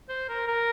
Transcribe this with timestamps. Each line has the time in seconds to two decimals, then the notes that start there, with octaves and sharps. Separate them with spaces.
0.09 C5
0.29 A#4
0.48 A#4